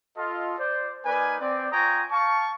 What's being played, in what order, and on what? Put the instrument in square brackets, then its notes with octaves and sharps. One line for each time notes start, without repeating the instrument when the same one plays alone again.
[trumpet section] F4 A4 D#5
C5 D5
A#3 D#4 A#4 B4 D5 G#5
C4 D5
F4 G5 G#5 A#5 C#6 D#6
F5 A5 C#6